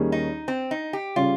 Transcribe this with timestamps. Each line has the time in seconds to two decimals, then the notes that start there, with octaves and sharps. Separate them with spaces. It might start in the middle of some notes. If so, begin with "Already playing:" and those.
Already playing: D#2 D#3 G3 C#4 G#4
0.12 D#4
0.48 C4
0.71 D#4
0.93 G4
1.16 C#3 G3 C#4 F4